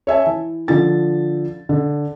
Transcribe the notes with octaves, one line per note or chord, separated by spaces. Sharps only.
C#5 E5 G#5 A5
E3
D3 F3 A6
D3